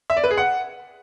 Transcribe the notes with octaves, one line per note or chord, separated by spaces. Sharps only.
E5
D5
B4
G#4
F#5